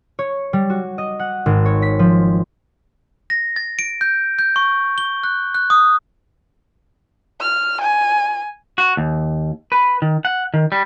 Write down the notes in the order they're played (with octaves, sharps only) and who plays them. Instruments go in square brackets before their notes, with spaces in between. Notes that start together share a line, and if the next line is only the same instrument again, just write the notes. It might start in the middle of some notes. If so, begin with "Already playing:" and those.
[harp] C#5
G3
F#4
D#5
F#5
G#1
C#5
B6
F3
[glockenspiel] A#6
A6
D7
G6
G6
C#6
G7
F#6
F#6
D#6
[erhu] F6
G#5
[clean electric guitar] F#4
D#2
B4
D#3
F#5
D#3
G3